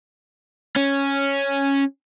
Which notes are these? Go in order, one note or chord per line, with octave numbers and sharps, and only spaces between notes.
C#4